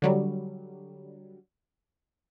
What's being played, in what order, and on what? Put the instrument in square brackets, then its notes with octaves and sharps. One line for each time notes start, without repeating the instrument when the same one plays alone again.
[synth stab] D3 F#3 G3